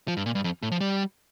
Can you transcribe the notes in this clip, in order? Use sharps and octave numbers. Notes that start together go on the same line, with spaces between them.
F3
G2
A#2
G2
F2
A2
F3
G3